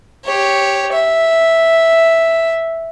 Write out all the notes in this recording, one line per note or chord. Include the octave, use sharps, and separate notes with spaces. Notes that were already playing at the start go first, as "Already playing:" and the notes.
G4 C#5
E5